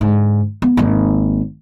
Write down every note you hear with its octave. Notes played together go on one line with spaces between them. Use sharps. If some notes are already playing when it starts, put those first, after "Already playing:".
G#2 D3
B3
G#1 A#3